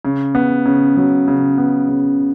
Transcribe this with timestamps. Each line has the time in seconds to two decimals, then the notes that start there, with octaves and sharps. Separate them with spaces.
0.05 C#3
0.35 B3
0.66 C#3
0.97 F#3
1.28 C#3
1.58 B3
1.89 C#3